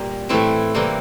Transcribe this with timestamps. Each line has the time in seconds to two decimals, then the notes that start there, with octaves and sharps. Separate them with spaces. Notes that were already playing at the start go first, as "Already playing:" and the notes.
Already playing: A#2 G3 A#3
0.29 A2 E3 A3 C4 E4
0.75 C3 E3 G3 A#3